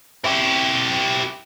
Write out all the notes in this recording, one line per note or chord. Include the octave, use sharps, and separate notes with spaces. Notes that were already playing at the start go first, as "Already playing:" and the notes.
E4 G4